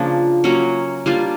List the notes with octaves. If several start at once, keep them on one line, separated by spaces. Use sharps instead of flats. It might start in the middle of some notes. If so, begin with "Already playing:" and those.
Already playing: C#3 F3 A#3 D4
F#3 A#3 C#4
G3 A#3 D4 F4